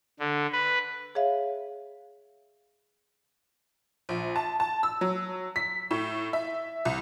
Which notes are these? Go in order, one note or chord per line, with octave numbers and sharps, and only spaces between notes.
D3
B4
G#4 C#5 E5 F5
A#1
A5
A5
E6
F#3
B6
A2
E5
C2